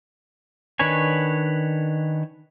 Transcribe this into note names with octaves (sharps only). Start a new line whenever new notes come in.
D#3 D4 B4 C#5 G#5